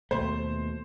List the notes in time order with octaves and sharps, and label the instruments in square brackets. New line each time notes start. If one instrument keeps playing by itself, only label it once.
[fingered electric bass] D#2 B2 A3 [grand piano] C5